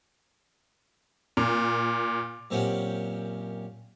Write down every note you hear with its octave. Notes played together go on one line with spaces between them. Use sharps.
A#2
F#2 A#2 C4 C#4 G4 F#5